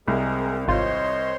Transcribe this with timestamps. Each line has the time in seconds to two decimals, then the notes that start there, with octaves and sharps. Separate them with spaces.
0.08 C2 G#3 C4 G#4 A#4
0.68 G#1 F4 C5 C#5 D#5 C6